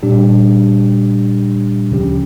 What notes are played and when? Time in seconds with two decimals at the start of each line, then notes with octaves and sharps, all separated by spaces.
0.03 A#2 G3 D4 G4
1.91 D2 C#3 F3 C#4 G4